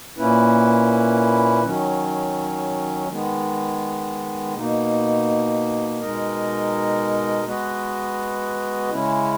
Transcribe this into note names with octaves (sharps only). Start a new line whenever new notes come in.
A#2 A#3 C#4 E4 B4
D#3 F#3 C#4
D#3 G#3 B3
B2 A#3 D#4
B2 G#3 D#4 A#4 D#5
G#3 B3 F#4 B4 D#5
C#3 G#3 C#4 E4